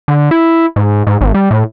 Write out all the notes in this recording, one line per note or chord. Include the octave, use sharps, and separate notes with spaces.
D3
E4
G#2
G#2
G#1
G3
A2